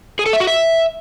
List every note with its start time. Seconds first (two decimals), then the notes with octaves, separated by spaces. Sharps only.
0.19 G#4
0.26 A4
0.33 E5
0.40 F#4
0.47 E5